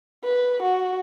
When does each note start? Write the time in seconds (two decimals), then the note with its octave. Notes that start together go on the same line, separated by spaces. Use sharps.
0.24 B4
0.63 F#4